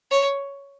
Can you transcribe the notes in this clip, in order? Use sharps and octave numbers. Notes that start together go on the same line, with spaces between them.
C#5